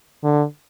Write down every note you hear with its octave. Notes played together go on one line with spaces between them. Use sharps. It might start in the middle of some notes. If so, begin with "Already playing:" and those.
D3